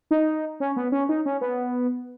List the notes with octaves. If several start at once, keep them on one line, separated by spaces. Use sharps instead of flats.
D#4
C#4
B3
C#4
D#4
C#4
B3